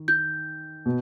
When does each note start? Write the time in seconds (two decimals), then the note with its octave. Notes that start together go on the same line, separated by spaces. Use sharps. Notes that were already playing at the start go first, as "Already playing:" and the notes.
Already playing: D#3
0.08 G6
0.86 B2